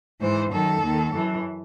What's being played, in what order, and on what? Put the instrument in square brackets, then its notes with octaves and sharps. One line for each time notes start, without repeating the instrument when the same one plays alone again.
[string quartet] G#2 E3 C5
F#2 D#3 A4
D#2 D#3
F#2 E3